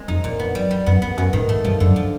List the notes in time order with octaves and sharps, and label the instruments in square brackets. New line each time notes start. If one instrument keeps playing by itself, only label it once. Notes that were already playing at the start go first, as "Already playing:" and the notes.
Already playing: [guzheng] G#3 C4
[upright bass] F2 [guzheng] D#4
[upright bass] F2 [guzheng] A#2
[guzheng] B3
[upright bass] F#2 [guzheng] G3
[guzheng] G3
[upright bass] F#2 [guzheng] B3
[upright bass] F2 [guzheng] B3
[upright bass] F#2 [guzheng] B3
[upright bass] G#2 [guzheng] D#3
[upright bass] G#2 [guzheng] A3
[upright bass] G2 [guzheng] F3
[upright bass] F#2 [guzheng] D3
[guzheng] F3